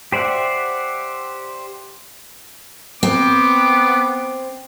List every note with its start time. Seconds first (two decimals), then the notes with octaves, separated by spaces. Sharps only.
0.12 G4 C5 D5 E5 F#5
3.03 B3 C4 D6